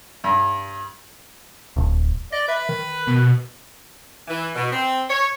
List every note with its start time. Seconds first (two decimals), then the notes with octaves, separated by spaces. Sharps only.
0.24 G2
1.76 D1
2.32 D5 D#5
2.48 B4 E5
2.69 D#3
3.07 B2
4.28 E3
4.54 B2
4.70 C4
5.08 C#5